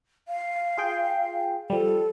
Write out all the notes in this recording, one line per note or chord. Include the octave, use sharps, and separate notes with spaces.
F5
F4 G#4 G5
F3 G3 A4